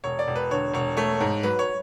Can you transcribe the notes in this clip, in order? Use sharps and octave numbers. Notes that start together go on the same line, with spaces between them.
E1 C#5
D5
E1
B4
D3 C#5
E1 C#5
A3 C#5
G#2
F#3 B4
C#5